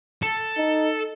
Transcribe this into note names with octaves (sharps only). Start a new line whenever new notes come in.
A4
D#4